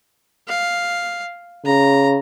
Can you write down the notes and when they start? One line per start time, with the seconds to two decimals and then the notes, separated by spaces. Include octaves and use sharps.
0.48 F5
1.65 C#3 A#5